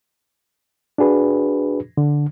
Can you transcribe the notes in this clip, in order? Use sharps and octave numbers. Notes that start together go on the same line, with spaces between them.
D4 F#4 G#4 B4
D3